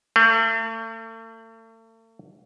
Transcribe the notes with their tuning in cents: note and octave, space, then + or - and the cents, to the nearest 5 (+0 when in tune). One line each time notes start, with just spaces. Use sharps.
A3 +40